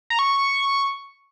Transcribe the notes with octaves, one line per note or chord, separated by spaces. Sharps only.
A#5
C#6